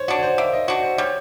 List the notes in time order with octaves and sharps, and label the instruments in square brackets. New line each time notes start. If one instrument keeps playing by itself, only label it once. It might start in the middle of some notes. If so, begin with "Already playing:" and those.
Already playing: [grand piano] C5 C#5
[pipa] D4 F#4 [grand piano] D5
[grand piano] C#5
C5
[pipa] A#3 [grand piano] E5
[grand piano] D#5
[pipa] D4 F#4 [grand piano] D5
[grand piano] C5
[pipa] G3 [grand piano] C#5